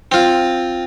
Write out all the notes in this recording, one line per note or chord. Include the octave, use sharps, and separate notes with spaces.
C4 F4